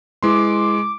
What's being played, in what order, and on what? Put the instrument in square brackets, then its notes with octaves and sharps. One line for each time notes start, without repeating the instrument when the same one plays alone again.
[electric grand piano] G#3 C6 [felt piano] E4 B4 [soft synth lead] D6